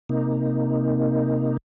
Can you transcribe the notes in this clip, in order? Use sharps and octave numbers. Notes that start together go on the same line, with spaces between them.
C3 A#3 D#4